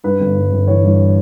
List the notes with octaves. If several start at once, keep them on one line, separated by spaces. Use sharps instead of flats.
G2 B4
G1
G2
G1
E3 C#5
G2